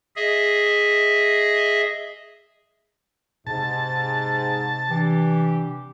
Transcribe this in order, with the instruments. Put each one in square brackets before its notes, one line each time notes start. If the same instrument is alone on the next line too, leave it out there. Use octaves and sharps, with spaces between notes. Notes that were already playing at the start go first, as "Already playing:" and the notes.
[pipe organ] G#4 D#5 E5
[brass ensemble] G#2 [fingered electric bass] C3 [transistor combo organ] A5
[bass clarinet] E3 [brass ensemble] D4 G4